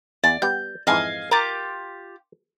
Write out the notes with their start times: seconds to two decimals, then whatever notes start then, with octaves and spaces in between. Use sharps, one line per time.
0.24 E2 D5
0.42 G3 B3 G4 G6
0.87 F2 G#2 E3 D#5 F5 G#5
1.31 F4 G4 A#4 D6